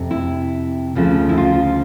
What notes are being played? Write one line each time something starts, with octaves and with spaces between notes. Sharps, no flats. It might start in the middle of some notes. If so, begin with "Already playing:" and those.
Already playing: F2 C3
E4
D2 C#3 F3 G#3
E4
F4